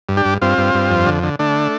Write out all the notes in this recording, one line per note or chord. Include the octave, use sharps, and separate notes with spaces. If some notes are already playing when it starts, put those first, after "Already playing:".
G2
D4 G4
G2
G2 C4 F4
G2
G2
F2
D3
D3
D3 A3 D4